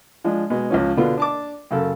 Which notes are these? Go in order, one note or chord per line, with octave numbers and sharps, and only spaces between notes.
F3 G#3 D4
B2 G#3
C#2 F3 C#4
B2 D3 B3 F4
D4 A5 D6
F#2 C#3 A4